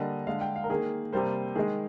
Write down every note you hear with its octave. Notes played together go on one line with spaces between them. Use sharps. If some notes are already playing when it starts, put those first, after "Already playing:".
Already playing: D3 G3 A#3 D#5
D3 G#3 F5
G5
F5
A#4
D#3 A#3 G#4
C3 G3 A#3 C5
D#3 G#3 G#4